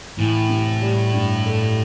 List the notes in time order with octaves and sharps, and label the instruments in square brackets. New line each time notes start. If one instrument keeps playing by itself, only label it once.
[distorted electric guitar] A2 [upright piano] E3
[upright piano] C3
G3
G2
A3